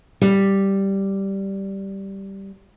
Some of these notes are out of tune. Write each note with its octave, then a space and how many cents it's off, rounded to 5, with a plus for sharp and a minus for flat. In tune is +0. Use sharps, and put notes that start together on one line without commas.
G3 -5